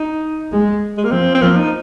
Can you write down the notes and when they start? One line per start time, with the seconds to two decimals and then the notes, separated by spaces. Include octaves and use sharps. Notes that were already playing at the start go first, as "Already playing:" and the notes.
Already playing: D#4
0.52 G#3
0.98 G#3
1.04 A#3
1.11 F3 C4
1.35 C4
1.42 F3 A#3
1.57 D#4